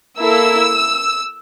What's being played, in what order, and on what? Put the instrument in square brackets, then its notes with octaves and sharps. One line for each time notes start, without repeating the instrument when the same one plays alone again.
[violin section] A#3 E4 A4 E6